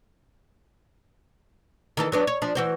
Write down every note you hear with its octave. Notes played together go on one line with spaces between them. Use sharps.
D#3 E3 A4
F#3 B3 D4
C#5
F3 D4
E3 F#4 C5